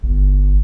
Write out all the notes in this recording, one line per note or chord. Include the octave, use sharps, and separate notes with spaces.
G1